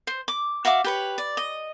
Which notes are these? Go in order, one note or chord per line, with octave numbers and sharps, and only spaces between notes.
C5
D6
F#4 E5 F5 D6
G4 B4 C#5
D5
D#5